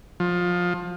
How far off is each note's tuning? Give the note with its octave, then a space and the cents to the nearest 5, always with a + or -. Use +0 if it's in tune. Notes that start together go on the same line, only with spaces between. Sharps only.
F3 +20